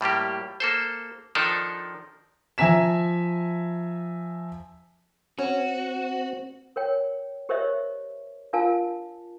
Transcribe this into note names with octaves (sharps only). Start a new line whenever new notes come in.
A2 G3 A#3 G4
A#3 A4 C5
D#3 F3 D4 D#4 A4 A#4
F3 E5 G#5 A#5 B6 E7
C4 C#4 F#4
A#4 C#5 G5
G4 A#4 C5 C#5 D#5 E5
D4 F4 A#4 F5 G#5 A5